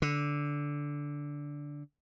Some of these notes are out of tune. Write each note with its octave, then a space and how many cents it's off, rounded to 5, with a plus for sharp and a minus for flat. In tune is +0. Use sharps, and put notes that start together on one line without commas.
D3 -10